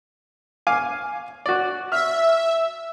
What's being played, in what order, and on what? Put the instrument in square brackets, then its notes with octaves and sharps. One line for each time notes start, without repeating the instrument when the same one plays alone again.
[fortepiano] F5 G#5 D6
F#4 D5
[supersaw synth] E5 [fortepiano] F6